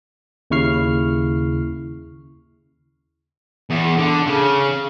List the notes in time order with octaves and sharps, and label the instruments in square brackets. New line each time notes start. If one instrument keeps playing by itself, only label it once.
[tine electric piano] D#2 C#3 E4 C#6 F6 C7
[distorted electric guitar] E2
D3
C#3